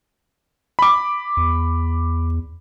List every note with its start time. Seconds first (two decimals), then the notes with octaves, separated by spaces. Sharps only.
0.79 B5 D6
1.37 E2